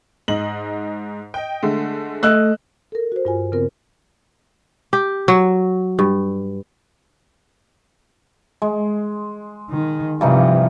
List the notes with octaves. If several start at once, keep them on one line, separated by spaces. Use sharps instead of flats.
G#2 D#5 F#7
D#5 G5
D3 G#3 A3
A3 D#5 E6 F#6
A4 A#4
F#4 C5
G2 F4 G#5
C#3 B3 C4 F4 A#4
G4
F#3
G2
G#3
D#3
G2 C3 E3 F3 D#4